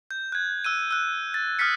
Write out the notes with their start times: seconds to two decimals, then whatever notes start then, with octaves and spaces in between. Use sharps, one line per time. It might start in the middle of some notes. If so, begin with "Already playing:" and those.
0.11 G6
0.32 F#6 G#6
0.64 E6 F#6 D#7
0.91 E6 F#6
1.34 A6
1.59 D#6 F6 F#6 A6 B6 C#7